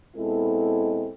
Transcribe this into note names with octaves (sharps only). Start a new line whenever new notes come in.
B2 G#3 C4 E4 A4